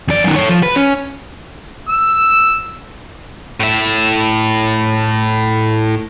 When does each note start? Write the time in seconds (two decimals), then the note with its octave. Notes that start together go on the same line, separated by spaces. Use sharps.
0.08 F2 D5
0.24 F#2 D#3
0.36 A4 C#5
0.49 F3
0.63 B4
0.76 C#4
1.89 E6
3.60 A2 E5